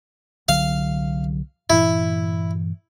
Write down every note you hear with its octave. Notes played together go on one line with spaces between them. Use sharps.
C2 D3 F#3 F5
G2 A#2 E3 E4